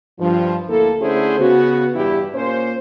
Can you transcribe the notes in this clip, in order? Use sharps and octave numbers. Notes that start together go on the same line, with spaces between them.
G2 F3
D2 A#3 E4 A4
D3 A3 C#4 E4 G#4 C5
C#3 B3 F#4
E2 G2 E4 G4
A#2 A#3 C#4 C5